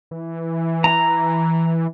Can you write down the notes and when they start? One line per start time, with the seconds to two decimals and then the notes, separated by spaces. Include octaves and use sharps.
0.11 E3
0.84 A#5